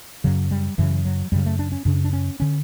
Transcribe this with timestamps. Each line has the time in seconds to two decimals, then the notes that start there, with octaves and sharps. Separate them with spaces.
0.24 F#2 C#3 F#3
0.51 G3
0.78 F#2 C#3 E3
1.05 F#3
1.32 F#2 C#3 G3
1.46 A3
1.59 D4
1.72 C#4
1.85 F#2 C#3 D4
2.04 D4
2.13 C#4
2.40 D3 C#4